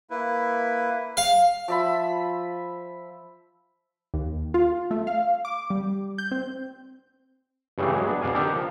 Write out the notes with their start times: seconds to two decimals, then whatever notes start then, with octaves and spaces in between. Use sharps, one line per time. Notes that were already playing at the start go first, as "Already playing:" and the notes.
0.10 A#3 E4 B4
1.17 F5
1.68 F3 E5 B5
4.14 D#2
4.54 F4
4.91 A3
5.07 F5
5.45 D6
5.70 G3
6.18 G6
6.31 C4
7.78 G2 C#3 E3 G3 A3
7.94 F#3 G#3
8.07 B3 D4
8.22 F2 B2 D5 F5 G#5
8.35 D3 D#3 D4 G4 A4 A#4
8.56 F3